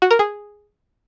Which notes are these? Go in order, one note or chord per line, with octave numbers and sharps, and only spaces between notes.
F#4
A#4
G#4